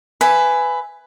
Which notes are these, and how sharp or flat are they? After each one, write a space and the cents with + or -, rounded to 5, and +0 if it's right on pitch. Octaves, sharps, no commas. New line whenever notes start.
B4 +15 E5 +0 G#5 +0